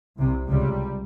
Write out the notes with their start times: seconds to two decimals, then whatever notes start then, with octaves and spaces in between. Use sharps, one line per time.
0.17 C2 C3
0.49 C#2 C3 G3